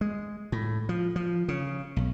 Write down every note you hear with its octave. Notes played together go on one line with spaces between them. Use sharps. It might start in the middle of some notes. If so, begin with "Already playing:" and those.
G#3
A2
F3
F3
C#3
B1